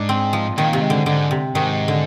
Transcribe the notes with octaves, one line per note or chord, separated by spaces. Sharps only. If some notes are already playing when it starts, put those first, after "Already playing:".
Already playing: G#2 D4
C4
F3
A#2 D#3
C3
G#2
D3
G#2 D3
C3
G#2 D#3
D3